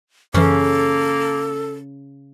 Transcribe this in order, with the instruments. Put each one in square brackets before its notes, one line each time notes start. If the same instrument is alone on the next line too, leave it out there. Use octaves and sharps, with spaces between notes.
[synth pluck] F#2 E3 [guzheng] C#3 C#4 [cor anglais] A#3 [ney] A4